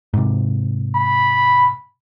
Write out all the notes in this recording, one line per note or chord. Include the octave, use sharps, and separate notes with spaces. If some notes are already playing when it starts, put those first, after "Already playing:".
G#2 C3
B5